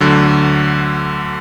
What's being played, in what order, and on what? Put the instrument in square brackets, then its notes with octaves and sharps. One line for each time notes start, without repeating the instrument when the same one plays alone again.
[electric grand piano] D2 D3 F#3